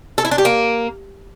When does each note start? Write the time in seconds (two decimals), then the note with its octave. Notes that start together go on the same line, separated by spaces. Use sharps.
0.18 A4
0.25 E4
0.31 D4
0.38 G4
0.45 A#3